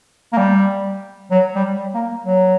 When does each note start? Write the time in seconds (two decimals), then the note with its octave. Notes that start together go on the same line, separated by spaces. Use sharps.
0.32 A#3
0.37 G3
1.31 F#3
1.55 G3
1.94 A#3
2.25 F#3